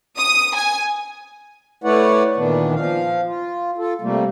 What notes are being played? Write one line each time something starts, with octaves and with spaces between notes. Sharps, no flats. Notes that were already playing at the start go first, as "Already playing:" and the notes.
D#6
G#5
A3 E4 B4 C#5 D5 F#5
A#2 D#3 E3 B3 D4
F3 F5
F4
F4 A4
C3 G3 A3 A#3